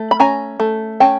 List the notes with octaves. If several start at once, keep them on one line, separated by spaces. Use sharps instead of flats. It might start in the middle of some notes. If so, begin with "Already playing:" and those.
Already playing: A3
B5
C#4 G#5 A#5
A3
C#4 G5 A5